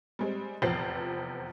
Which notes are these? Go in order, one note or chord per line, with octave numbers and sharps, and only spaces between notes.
G3 G#3 C4
F1 E2 F3 C5 A6 C7